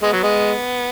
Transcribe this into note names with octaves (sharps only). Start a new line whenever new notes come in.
G#3 B3
F#3
G#3